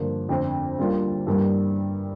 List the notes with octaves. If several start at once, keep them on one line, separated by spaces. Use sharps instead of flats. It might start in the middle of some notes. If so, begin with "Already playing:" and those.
Already playing: G2 D3 F3 A#3
F2 D3 A3 C4
D2 D3 G3 A#3 F4
G2 E3 G3 A#3